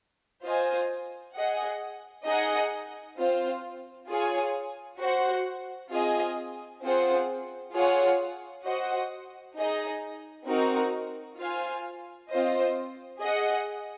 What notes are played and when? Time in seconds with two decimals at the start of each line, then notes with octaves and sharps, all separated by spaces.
0.43 F4 C5 D#5 G#5
1.35 G#4 D#5 F#5
2.25 D#4 G#4 D#5 F#5
3.18 C4 F4 C5
4.08 F4 G#4 C#5 G#5
4.99 F#4 C5 F#5
5.91 C4 F4 G#4 D#5 G#5
6.82 C4 F4 G#4 C5 F#5
7.73 F4 G#4 C#5 F#5
8.64 F#4 C5 D#5 F#5
9.56 D#4 G#4 D#5
10.47 C4 D#4 F#4 A#4
11.38 F4 C5 F5 G#5
12.30 C4 F4 C5 D#5
13.21 G#4 D#5 F#5